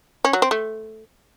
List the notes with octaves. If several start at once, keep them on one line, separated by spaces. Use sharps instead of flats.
C#4
F#3
C4
A3